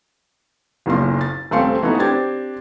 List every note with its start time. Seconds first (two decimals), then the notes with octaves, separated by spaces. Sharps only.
0.86 F#1 B1 A#2 C6
1.21 A6
1.51 D#1 A3 C4 F5 C6 C#7
1.83 E3 A3 B3 D#4 F#4
1.99 C4 D4 G4 G#6 A6